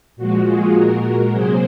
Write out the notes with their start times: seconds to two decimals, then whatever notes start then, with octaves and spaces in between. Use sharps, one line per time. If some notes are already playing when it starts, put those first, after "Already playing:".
0.16 A#2 F3 G#3 F#4
0.45 F4 G#4
0.73 A#2 G#3 F#4 A#4
1.30 C3 F#3 A#3 G#4 C5